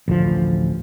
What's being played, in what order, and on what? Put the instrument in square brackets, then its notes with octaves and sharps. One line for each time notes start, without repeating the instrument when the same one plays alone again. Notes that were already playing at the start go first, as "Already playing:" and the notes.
[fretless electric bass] A1 D2 F3